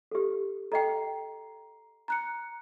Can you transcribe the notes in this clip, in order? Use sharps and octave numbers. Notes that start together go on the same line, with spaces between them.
G4 A4
A4 D#5 G5 A#5 C7
A#5 F#6 C#7